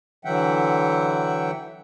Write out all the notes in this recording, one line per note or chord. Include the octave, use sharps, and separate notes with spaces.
D3 E3 F#3 E5 F#5 G5